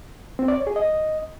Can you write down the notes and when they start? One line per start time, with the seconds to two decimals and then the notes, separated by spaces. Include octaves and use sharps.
0.39 C4
0.48 D5
0.57 C#5
0.67 G#4
0.76 D#5